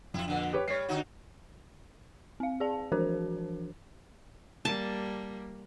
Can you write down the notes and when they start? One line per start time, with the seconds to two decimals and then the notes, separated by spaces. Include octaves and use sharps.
0.14 F2 E4 F4
0.28 A#2 D3
0.53 G4 B4 C#5
0.68 G3 C#5 C7
0.88 D3 D#4 F#4
2.40 C4 F5
2.60 G#4 D5 A5
2.92 E3 F3 D4 F#4 A#4 C5
4.65 G3 A#3 A5